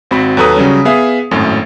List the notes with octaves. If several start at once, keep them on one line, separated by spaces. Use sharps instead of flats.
G#1 C4 F#4 B5
D#2 F#3 A4 B4 A#5 D#6
C#3 F#3 G3 C#4
B3 G#4 E5 F5
G#1 F#2 A2